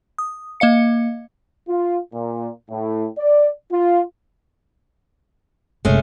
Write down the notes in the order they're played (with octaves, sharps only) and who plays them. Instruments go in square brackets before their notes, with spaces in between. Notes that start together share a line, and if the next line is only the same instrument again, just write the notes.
[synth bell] D#6
A#3 D#5 F5 C#7
[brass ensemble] F4
A#2
A2
D5
F4
[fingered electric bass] F#1 C3 [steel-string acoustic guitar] G#3 A3 C#4